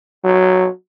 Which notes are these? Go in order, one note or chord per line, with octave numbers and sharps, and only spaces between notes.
F#3